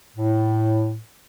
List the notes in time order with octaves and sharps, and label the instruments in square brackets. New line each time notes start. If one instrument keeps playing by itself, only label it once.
[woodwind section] A2